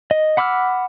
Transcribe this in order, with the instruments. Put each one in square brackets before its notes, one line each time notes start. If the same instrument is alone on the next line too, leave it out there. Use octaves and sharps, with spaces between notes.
[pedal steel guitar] D#5
F#5 B5 D6 E6 F6